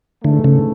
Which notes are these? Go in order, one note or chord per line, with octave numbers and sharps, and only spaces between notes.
G#2 D3 E3 A3
C#3